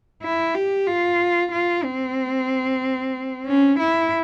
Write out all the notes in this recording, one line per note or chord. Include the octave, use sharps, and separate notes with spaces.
E4
G4
F4
F4
C4
C#4
E4